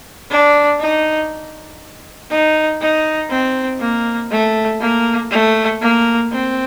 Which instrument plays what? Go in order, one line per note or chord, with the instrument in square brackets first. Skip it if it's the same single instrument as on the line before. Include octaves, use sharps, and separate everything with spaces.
[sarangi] D4
D#4
D#4
D#4
C4
A#3
A3
A#3
A3
A#3
C4